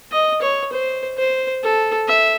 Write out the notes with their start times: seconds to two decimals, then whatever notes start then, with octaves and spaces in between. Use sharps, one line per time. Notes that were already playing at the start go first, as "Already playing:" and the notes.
0.12 D#5
0.42 C#5
0.72 C5
1.17 C5
1.63 A4
2.08 E5